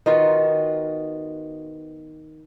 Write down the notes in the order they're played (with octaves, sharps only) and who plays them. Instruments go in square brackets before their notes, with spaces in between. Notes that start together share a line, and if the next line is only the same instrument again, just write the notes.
[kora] D#3 B3 F4 F#4